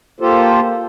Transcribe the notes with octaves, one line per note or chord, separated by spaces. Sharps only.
A#3 F4 G4 A4 C5